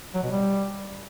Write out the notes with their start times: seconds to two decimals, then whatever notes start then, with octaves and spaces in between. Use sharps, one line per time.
0.14 F#3
0.23 B2
0.31 G3